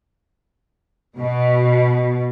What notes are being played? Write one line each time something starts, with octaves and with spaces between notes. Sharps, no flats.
B2